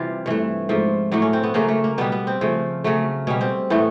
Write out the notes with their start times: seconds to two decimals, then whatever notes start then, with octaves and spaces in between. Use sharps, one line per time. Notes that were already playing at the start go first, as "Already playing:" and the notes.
Already playing: C3 E3 G3 F4
0.26 G2 E3 A3
0.69 G#2 F3 A3
1.12 A2 F#3 A3 D4
1.22 C#4
1.33 C4
1.43 B3
1.54 C#3 F#3 A3 A#3
1.68 A3
1.84 A#3
1.98 B2 G3 B3
2.12 B3
2.27 C4
2.41 C#3 F3 A3
2.84 C#3 F#3 A3
3.27 B2 G3 C#4
3.41 C4
3.70 A2 E3 A3 B3